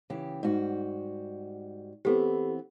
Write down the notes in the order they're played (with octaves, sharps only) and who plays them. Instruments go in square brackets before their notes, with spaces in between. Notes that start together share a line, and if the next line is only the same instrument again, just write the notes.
[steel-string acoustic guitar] C#3 E3 G4
G#2 G3 F#4
[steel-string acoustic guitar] E3 B3 C4 [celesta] G4 A4